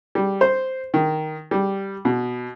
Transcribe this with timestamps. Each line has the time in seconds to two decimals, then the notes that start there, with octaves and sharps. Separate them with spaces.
0.15 G3
0.41 C5
0.94 D#3
1.51 G3
2.05 B2